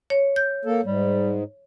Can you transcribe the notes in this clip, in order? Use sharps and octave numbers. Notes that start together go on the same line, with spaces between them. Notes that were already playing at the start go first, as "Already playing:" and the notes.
C#5
G6
A#3 A4
G#2 G3